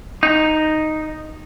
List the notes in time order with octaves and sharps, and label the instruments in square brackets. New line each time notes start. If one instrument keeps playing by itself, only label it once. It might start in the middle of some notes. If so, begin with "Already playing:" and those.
[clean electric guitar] D#4